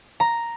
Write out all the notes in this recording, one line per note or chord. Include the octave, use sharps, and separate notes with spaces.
A#5